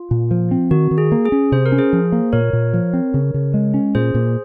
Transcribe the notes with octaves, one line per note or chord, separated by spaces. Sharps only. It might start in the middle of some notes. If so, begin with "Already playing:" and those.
Already playing: F4
A#2
F3
C4
D#3 F#4
D#3
G#4
A#3
G#4
C#4
C3 C5
A#4
C#4
G#4 C5
F3
A#3
A#2 A#4 C#5
A#2
F3
C4
C#3
C#3
G#3
C#4
A#2 G#4 C5
A#2